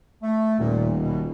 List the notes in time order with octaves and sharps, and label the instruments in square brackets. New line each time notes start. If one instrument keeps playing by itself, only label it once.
[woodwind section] A3
[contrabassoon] D#1 [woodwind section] A#2
[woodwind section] B2